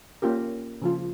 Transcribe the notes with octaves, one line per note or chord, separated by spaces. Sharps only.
A#3 C#4 F4 G4 A#4
C#3 F3 F4